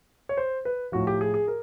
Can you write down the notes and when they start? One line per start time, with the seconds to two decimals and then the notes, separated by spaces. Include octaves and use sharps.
0.29 C#5
0.37 C5
0.65 B4
0.92 A2 F3 F#4
1.07 G4
1.21 G#4
1.34 G#4
1.48 A#4